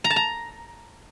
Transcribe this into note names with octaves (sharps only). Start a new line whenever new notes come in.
A#5
A5
A#5